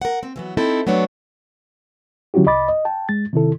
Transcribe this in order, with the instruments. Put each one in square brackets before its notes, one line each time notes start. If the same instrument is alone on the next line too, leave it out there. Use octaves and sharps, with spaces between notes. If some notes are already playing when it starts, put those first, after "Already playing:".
[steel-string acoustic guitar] A#4 F#5
C4
E3 F#3 B3
C4 D#4 E4 A4
F#3 A3 B3 D4 C#5
[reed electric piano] D3 F#3 C#4 E4 F#4 G4
C2 D#5 B5 D6 A6
D#5
G5 A5
G#3 A6
C3 D#3 E4 A4